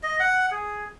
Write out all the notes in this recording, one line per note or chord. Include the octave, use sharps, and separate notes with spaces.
D#5
F#5
G#4